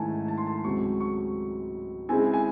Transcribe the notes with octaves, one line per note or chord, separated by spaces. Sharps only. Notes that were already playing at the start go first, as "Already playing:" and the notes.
Already playing: G#2 D#3 A3 C#4 E4 G#5 A5
A5
C6
A5
C#2 C3 F#3 C4 C#6
C#6
C#3 G#3 C4 E4 G#5
G#5